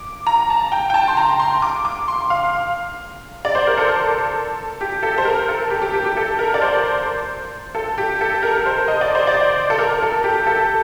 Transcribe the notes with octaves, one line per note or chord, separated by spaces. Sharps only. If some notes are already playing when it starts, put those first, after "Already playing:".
Already playing: D6
A#5
A5
G5
G5
A5
C6
A#5
C6
D6
D6
C6
F5
D5
C5
A#4
A4
G4
A4
C5
A#4
A4
G4
G4
G4
G4
A4
A#4
D5
C5
A4
G4
A4
A#4
C5
D#5
D5
C5
D5
A4
A#4
A4
G4
A4